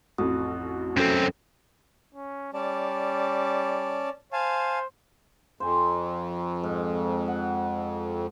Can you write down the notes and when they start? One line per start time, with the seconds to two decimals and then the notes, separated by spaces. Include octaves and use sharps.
0.18 A1 F2 F#4 D#6
0.97 F#2 C4 C#4 A4
2.15 C#4
2.54 G3 C#4 D5 A5
4.33 C5 F5 G#5 A5
5.60 F2 C5 G#5
6.63 G#2
7.28 F#5